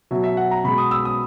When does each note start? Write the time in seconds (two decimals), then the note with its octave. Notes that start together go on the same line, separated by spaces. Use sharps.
0.11 B2 F#3 E5
0.24 E5
0.37 F#5
0.51 A#5
0.64 B2 G#3 B5
0.78 D#6
0.91 E6
1.05 D#6